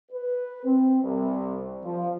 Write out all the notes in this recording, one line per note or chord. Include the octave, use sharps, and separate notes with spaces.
B4
C4
C2
F3